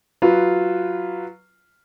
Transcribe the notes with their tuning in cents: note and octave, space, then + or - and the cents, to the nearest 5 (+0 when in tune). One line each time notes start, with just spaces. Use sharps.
F#3 +0 F4 -5 B4 +0